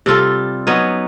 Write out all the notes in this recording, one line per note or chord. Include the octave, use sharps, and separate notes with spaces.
C3 G3 F4 A4
F#3 B3 C#4 D#4